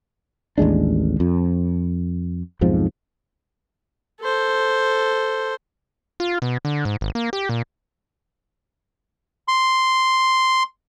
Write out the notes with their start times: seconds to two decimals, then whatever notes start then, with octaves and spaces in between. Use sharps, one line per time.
0.58 A1 D#2 G#3 D4
1.20 F2
2.61 B1 F2 G#2 F3
4.21 A4 C5
6.20 F4
6.42 B2
6.65 D3
6.85 G#2
7.01 G#1
7.15 A#3
7.33 G4
7.49 A#2
9.48 C6